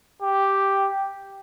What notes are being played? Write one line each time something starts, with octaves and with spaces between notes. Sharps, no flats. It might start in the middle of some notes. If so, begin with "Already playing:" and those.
G4